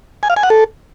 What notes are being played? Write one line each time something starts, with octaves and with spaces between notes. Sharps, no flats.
G#5
F5
G#5
F#5
A4